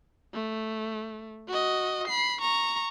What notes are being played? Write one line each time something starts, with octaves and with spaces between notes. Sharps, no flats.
A3
F#4 D#5
B5 C7
A#5 C#6